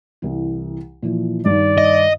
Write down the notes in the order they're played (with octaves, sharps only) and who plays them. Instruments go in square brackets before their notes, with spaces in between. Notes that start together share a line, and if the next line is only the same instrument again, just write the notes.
[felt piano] C2 E3
A#2 E3 F3
[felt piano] G2 D#3 [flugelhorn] D5
[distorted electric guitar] D#5